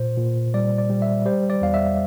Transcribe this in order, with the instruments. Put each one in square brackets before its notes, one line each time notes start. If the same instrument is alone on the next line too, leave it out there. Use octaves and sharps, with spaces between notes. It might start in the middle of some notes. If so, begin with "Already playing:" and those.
Already playing: [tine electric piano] A#2 C5
A#2
G3 D5
D5
G3
E5
G3 C5
D5
E2 F5
E5